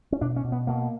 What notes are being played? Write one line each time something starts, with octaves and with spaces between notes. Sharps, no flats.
C#4
B2 D4
C#4
B2
B3
B2 A#3